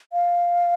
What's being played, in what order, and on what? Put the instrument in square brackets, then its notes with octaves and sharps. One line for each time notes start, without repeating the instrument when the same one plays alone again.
[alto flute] F5